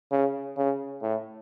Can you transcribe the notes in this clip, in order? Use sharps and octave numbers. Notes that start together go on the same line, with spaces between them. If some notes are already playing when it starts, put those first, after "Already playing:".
C#3
C#3
A2